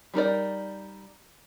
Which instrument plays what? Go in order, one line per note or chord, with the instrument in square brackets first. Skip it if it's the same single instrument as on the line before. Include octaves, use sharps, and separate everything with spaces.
[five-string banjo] G3 D#4 A#4 D5